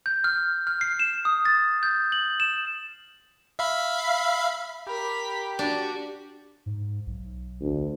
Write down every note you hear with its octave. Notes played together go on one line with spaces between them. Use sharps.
G6
F6
F6
C7
E7
D#6
A6
G6
F#7
E7
E5 F5 B5
G4 A#4 B5 B6
D4 F#4
G#2
B1
D2